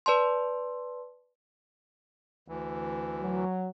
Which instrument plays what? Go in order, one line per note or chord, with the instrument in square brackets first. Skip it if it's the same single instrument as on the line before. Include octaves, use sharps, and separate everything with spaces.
[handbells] B4 D5 A5 C6
[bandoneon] D2 E3
[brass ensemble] F#3